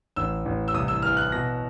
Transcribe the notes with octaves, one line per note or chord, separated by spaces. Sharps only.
A1 E6
A1
E6
C2 D#6
E6
E3 F6
F#6
B2 A#6